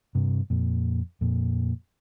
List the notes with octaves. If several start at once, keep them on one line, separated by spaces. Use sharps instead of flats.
G2 C3
F2 A#2
F2 A#2